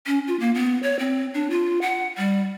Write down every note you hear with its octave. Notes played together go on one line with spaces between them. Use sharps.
C#4
F4
A#3
B3
C#5
C4
D4
F4
F#5
G3